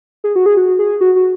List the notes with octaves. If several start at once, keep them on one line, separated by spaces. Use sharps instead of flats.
G#4
F#4
G#4
F#4
G#4
F#4
F#4